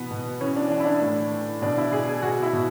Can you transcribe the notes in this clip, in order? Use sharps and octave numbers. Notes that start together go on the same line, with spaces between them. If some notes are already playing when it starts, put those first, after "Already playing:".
Already playing: B2 E3 B3
B2
E3 C#4
D4
E3 D4
E4
D4
A2
E3
B2 D4
E4
B2 G#4
G#4
B2 F#4
E4
B2